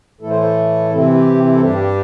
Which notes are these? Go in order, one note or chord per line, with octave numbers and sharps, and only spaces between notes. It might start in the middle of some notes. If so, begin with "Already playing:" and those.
A2 E3 A3 E4 A4
C5
A4
C3 E3 C4 E4
G4
E4
A4
G2 G3 D4 G4
G4